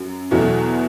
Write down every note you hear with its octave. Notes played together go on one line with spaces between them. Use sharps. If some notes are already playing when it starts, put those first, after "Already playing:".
Already playing: F#2 F#3
E2 B2 F#3 A3 E4